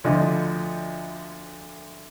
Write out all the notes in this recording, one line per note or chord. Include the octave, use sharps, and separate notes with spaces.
D2 D3 F3 D#5